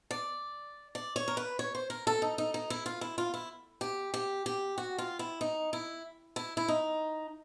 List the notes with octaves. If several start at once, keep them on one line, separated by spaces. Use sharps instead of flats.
D5
D5
C#5
A#4
B4
C#5
C5
A#4
A4
D#4
D#4
D#4
E4
F4
E4
F4
E4
G4
G4
G4
F#4
F4
E4
D#4
E4
E4
E4
D#4